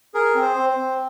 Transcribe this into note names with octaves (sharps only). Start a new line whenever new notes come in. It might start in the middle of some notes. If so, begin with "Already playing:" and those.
G#4 A#4
C4
C5
C4
C5
C4